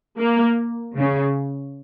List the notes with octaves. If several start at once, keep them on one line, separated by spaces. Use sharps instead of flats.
A#3
C#3